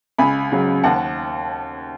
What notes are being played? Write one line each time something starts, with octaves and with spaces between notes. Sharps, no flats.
C#2 G#5 B5
C#3 F#3
D#2 F#5 A5